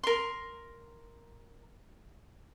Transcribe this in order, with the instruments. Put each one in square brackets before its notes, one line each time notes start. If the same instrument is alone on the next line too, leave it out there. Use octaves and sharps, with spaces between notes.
[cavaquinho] A#4 C6